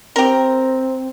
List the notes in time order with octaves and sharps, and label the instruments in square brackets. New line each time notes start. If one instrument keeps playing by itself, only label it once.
[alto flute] C4 [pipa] G4 A#4